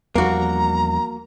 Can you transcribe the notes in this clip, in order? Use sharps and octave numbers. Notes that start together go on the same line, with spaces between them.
E2 F3 G3 A#3 F#4 A#5